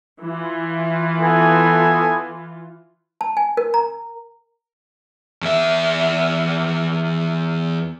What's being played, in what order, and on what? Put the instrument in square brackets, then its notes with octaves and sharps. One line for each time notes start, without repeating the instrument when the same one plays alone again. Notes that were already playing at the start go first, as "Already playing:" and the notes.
[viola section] E3 F4
[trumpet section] B3 A4 G#5
[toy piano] A5
G#5
A#4
A#5
[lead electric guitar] E2 E5